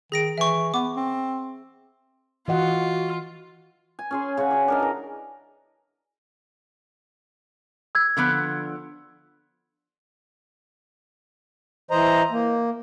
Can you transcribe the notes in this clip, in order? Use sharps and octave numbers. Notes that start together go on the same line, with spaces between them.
D#3 G#4 A#6 D7
E3 E5 C#6
B3 D6
C4
E3 F4 F#4 D#5 F#5
G#5
C#4 G#4 C6
C#3 C#5 E5 F#5
F#4 D5
D4 A#4 D#5
E3 A#4
E6 G#6
D3 F3 B3
E3 C5 D#5 A#5
A#3